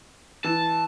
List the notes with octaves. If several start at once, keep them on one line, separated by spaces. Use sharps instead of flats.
E3 A5